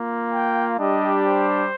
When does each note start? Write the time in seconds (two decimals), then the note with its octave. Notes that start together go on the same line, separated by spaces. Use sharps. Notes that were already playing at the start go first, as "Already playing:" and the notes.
Already playing: A#3 F4
0.33 G5
0.78 G3 D4 G4 D#5
1.25 C5